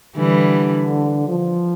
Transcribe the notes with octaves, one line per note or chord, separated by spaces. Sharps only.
D3 E3 G3
F3